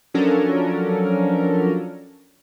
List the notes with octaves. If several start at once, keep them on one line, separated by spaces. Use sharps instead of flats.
F3 F#3 C#4 D4 A4 A#4